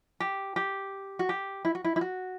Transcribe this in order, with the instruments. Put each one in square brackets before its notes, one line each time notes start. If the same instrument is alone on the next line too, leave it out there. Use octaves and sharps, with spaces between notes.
[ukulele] G4
G4
F#4
G4
E4
F#4
E4
E4
F#4